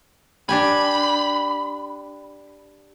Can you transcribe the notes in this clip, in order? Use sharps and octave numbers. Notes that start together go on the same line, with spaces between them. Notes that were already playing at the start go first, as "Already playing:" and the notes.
D4 G4 G#5 B5